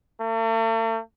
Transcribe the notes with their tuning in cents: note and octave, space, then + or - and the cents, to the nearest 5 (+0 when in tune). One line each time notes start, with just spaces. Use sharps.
A3 +45